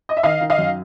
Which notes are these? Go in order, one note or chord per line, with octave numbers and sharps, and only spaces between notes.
D#5
E5
D#3 D#5 F5
D#3
D#5 F5
F#2